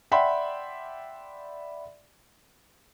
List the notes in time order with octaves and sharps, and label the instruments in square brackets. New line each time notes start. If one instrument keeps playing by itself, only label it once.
[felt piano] D5 E5 F#5 G5 B5 C6